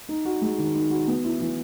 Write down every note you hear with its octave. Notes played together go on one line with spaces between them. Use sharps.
D#4
F#4
G#3
D#3
D#4
F#4
B3
E4
E3